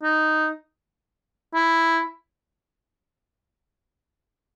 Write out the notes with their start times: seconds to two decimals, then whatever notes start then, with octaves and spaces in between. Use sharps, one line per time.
0.03 D#4
1.54 E4